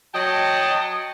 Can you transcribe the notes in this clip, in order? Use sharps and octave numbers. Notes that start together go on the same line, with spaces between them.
F#3 D#5 G5 A5